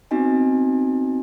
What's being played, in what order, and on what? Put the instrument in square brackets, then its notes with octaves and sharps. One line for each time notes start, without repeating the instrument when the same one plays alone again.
[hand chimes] B3 C4 D#4 F#4 D#5 G#5